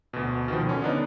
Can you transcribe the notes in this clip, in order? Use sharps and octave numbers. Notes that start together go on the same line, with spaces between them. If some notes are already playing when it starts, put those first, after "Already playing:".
D2 B2
B2 D#3 F3
D3 C#4
B3 D4 D#4